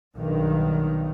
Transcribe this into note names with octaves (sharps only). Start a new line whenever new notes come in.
B1 G2 D#3